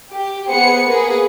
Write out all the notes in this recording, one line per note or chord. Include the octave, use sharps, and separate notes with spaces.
G4
B3 G#4 C5 C#7
A#3 G#4 B4